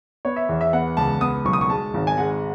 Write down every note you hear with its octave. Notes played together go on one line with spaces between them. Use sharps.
B3 C#5
E5
E2
E5
B3 F#5
C#2 A5
B3 D#6
B1 C#6
D#6
C#6
G#3 A5
G#1
G#5
G#3 F#5